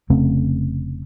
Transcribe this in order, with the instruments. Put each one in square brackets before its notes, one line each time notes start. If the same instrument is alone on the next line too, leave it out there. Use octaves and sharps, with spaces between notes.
[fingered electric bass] F1 C#3 A3 C4